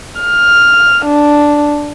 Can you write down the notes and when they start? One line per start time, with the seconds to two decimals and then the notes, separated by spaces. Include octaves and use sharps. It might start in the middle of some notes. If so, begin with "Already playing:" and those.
0.21 F6
1.05 D4